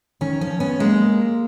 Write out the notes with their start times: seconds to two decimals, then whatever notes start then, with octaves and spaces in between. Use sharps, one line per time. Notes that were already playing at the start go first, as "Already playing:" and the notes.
0.21 D#3 C#4
0.41 F3 C#4
0.60 B3 C#4
0.79 G#3 A#3